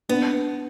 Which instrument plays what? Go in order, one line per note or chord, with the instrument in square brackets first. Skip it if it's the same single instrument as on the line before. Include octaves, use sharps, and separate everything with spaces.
[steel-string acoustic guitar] B3 [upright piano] D4